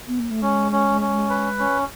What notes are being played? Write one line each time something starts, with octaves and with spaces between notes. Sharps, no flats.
B3
A#3
A3
G#3 C#4
C#4
C#4
B4
C#4